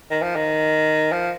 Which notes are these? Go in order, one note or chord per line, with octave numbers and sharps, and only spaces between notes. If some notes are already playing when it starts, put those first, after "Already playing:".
D#3
F3
D#3
F3